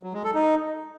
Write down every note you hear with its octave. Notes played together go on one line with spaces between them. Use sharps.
F#3
G#3
A4
D#4